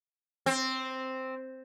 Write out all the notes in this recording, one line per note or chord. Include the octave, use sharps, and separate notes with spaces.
C4